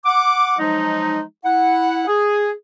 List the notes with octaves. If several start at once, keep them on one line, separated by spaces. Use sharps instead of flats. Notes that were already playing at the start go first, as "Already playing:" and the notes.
F#5 D6
F3 F#3 G#3 D#4
E4 F#5
G#4